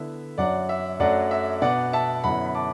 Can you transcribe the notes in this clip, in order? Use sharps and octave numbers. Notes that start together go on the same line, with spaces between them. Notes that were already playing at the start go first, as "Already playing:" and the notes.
Already playing: D3 B3 E4 E5
F#2 F#3 D4 D5 F#5
E5
F#2 F#3 A3 D4 D5 F#5
E5
B2 B3 D4 D5 F#5
E5 A5
F#2 D3 B3 E4 F#5 B5
B5
A5 D6